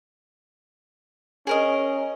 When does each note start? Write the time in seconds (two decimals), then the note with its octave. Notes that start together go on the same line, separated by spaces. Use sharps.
1.47 C#4 G#4 A#4 D#5